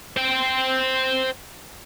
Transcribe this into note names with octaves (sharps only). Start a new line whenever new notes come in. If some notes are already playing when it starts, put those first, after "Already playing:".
C5 G5